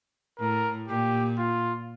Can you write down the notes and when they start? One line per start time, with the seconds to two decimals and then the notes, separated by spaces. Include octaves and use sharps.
0.39 A2 A#4
0.88 A#2 G4
1.38 F4